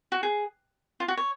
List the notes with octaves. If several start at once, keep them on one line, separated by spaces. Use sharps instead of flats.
F#4
G#4
F4
F#4
C#5